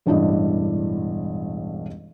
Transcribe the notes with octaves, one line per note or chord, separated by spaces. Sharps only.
E1 A1 G2 D4 E4 D#5